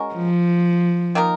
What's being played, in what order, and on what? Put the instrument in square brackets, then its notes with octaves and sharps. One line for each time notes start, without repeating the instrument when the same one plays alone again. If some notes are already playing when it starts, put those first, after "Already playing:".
Already playing: [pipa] G#3 C#4 F#4 A#4
[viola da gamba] F3
[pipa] D#3 A#3 D#4 A#4